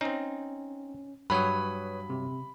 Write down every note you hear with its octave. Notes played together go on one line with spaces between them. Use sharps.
C4 C#4 D#4
G2 F#3 B4 C#5 B5 D#6
C3